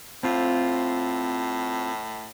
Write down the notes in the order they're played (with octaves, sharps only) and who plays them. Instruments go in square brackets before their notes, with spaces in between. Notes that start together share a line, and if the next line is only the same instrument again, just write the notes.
[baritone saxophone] A2 [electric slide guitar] C4 F4